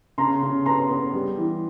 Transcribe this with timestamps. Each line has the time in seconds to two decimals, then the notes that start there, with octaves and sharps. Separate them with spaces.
0.18 C#3 A#5 C6
0.43 C#3
0.65 B3 A#5 C6
0.89 B3
1.13 G3
1.38 E3